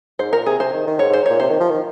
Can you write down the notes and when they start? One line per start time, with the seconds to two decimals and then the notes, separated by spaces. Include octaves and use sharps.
0.19 G#2 C5
0.33 A#2 A#4
0.46 C3 G#4
0.60 C3 C5
0.73 D#3
0.87 D#3
0.99 G#2 C#5
1.10 G#2 C5
1.26 A#2 C#5
1.40 C3 C5
1.50 D#3
1.60 F3
1.70 D#3